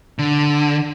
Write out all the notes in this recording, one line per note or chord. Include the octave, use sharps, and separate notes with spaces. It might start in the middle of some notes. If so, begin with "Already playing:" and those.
D3